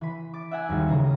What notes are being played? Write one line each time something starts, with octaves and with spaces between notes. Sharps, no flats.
E3 B5
D6 A6
E5 F#5 G#5
D#2 G#2 F#3 G3
A2 C#3 E3 A#5